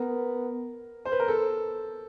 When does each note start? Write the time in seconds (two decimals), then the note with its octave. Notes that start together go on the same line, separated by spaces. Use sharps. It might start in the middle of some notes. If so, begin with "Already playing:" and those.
Already playing: B3 A#4
1.05 C5
1.12 B4
1.20 A#4
1.28 A4